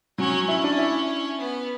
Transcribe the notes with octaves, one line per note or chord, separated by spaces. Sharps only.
F#3 C#4
C#4 E4
D4
E4
B3